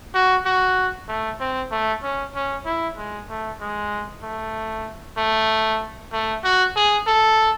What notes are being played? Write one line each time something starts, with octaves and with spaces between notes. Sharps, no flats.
F#4
F#4
A3
C4
A3
C#4
C#4
E4
G#3
A3
G#3
A3
A3
A3
F#4
G#4
A4